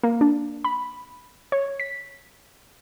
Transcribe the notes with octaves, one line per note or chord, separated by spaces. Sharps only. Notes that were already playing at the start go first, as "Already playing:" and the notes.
A#3
D4
B5
C#5
B6